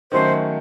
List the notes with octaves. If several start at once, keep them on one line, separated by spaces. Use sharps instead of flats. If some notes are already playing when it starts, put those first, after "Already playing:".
D#3 F#3 A3 C#4 C5